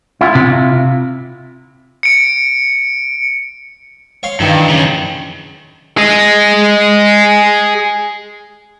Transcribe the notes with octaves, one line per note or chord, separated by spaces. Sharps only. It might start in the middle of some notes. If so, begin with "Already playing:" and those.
E4 F4
C3
C#7 D7
C#5 F5 C6
G2 D#3 E3
F#2 C#3
G#4 D#5